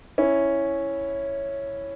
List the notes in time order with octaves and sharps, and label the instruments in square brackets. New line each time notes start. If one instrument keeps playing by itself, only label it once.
[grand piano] C#4 E4